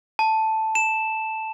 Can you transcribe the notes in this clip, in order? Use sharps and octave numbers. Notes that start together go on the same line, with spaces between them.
A5
E7